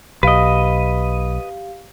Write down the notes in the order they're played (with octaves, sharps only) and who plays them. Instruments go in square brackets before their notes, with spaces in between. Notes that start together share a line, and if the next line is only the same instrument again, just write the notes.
[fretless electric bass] B1 [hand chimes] G4 F5 [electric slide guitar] B4 D#5